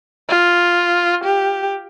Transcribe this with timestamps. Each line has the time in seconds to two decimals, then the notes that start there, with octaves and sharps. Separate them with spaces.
0.29 F4
1.24 G4